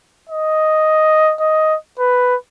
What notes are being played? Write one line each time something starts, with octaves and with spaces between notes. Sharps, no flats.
D#5
D#5
B4